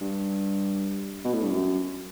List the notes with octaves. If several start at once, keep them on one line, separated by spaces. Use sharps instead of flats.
G2
B2
A2
G2
F#2